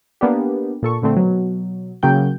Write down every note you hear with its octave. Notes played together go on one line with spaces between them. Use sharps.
A#3 B3 D4 G4
A#2 A4 C#6
A#2 D3 A3 C4
B2 F#3
C#3 F#3 A#3 G5 G6